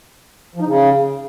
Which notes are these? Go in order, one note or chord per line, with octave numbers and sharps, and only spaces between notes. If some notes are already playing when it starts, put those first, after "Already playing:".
F3
D#4
C#3